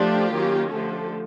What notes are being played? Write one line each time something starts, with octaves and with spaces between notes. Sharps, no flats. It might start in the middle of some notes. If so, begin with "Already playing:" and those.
Already playing: F3 A3 D4 F4 G4
D#3 F#3 A#3 C#4
D3 F3 A3 G4 A4